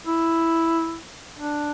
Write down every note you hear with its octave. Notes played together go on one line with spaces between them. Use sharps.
E4
D4